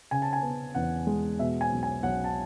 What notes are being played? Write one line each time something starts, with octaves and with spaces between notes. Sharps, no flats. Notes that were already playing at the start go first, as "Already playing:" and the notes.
C#3 G#5
A5
G#5
B3
E2 F#5
G#3
B2 E5
G#5
B1
G#5
B1 F#5
A5